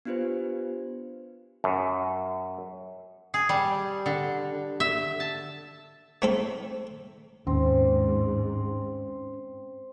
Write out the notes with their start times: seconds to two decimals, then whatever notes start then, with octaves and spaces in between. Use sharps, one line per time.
0.05 B3 D4 F4 G4 B4 C5
1.64 F#2
3.34 G#4
3.49 G3
4.06 D3
4.80 E5
5.20 A5
6.22 A3 C4 A4
7.47 D#2 G#2 C4 C#4